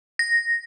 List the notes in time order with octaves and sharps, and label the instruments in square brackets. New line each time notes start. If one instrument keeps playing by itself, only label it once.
[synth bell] A#6